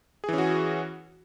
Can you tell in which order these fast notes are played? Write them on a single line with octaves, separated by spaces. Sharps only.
G#4 E3 C#4 F#4